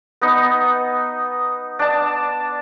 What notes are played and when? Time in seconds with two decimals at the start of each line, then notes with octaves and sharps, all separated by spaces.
0.21 B3 D#4
1.79 D4 A5